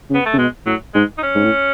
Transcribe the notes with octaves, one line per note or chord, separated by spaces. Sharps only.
C#3
B3
A3
C#3
B2 G#3
A2 F#3
G#2 G#3
D#4
C#4
G#2
A2